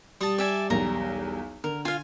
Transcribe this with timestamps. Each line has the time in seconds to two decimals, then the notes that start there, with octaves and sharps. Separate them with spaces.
0.21 G3 A5 D#6
0.38 D5 E5 G#5
0.70 B1 E2 A#4 A#5
1.64 D3 A#4
1.85 F4 F5 G#5